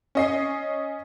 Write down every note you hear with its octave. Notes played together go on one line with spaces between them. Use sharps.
C#4 D#5 C7